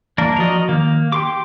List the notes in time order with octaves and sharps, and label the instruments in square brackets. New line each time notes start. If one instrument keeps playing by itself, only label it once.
[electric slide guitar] E3 [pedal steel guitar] A#3 D4 A#4
[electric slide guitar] F3 F#4 D5 [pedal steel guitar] A#4 D#5
[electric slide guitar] D#3 [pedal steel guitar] A#3
[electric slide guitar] G4 [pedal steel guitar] G5 C6 D6